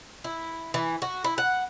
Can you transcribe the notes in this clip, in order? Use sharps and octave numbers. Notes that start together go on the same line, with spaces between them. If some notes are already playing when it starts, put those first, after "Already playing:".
E4
E3
F#4
E4
F#5